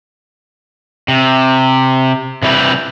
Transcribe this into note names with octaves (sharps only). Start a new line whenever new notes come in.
C3
C3 G3 E4 F#4 G4 B4